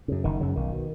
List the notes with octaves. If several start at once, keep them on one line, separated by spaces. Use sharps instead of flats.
F#2 C#3
F#1 D#3
F#2 C#3 F#3
B1 D#3
B2